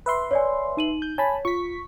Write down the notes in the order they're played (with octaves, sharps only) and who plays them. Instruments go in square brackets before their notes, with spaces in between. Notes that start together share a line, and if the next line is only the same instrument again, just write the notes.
[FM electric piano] B4 E5 C6
[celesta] C#5 D5 G#5
D#4 D#7 F#7
[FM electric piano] G6
[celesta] C#5 [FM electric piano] G#5 A5 B5
[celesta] F4 [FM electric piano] C#6 B6